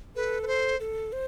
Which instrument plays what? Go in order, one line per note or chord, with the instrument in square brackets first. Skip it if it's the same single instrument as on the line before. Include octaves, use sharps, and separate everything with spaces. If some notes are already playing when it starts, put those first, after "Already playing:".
[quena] A4 [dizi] B4
[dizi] B4
C5
[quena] A4
C5